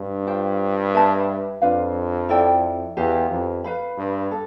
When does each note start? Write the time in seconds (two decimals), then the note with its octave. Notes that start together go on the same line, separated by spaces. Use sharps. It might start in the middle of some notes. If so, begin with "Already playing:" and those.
Already playing: G2 D4
0.27 F4 C5 G5
0.94 B4 E5 A5
1.62 F2 D4 F4 B4 F5
2.29 E4 A4 D5 G5
2.96 E2 G4 B4 F5
3.30 F2
3.64 B4 F5 B5
3.98 G2
4.31 A4